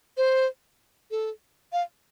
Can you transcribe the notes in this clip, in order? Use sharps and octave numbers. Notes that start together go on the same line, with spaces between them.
C5
A4
F5